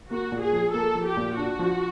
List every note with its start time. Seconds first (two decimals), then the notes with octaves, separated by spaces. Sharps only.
0.11 A#3 F#4
0.32 A#2
0.42 G#4
0.53 F3
0.74 A#3 A4
0.95 F3
1.06 G4
1.17 A#2
1.37 D4 F#4
1.59 F3